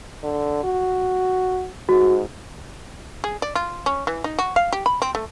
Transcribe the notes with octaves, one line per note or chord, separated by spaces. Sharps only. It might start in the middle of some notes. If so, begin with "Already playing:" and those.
D3
F#4
G#2 F#4
G#4
D5
F4
C#4
E3
D#4
F#4
F5
G4
B5
C4
A3